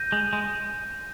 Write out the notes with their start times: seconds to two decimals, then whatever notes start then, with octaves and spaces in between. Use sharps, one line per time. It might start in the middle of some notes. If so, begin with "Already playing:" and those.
Already playing: G6 A#6 D#7
0.12 G#3
0.33 G#3